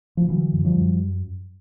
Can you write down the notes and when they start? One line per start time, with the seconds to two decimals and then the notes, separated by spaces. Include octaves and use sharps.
0.17 F3
0.28 D3 E3 F#3
0.53 F#2
0.65 F3 G3
0.76 F#2